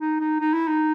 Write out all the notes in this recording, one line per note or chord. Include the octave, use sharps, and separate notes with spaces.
D#4
D#4
D#4
E4
D#4